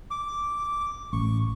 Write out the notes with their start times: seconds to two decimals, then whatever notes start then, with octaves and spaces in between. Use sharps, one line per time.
0.11 D6
1.13 A1 C#6